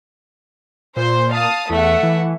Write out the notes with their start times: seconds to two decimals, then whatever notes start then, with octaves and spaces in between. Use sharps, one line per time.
0.97 A#2 C5
1.33 F5 A5 D#6
1.70 E2 A3 E5 F#5
2.03 E3